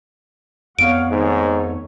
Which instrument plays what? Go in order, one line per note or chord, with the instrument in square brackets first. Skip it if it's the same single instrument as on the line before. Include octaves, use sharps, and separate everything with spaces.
[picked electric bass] F2 B3 [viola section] C#5 F5 F#5 [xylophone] D7
[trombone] G#2 [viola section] D#3 A3 C#5